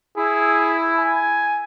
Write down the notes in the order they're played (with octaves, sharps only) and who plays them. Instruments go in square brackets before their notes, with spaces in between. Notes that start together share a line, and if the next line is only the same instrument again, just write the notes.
[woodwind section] E4 [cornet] G#4
[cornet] G#5